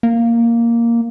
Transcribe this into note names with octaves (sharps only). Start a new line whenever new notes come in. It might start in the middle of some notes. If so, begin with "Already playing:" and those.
A#3